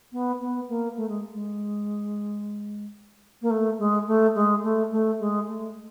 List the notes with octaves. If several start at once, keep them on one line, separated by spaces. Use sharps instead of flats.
B3
B3
A#3
A3
G#3
G#3
A#3
A3
G#3
A3
G#3
A3
A3
G#3
A3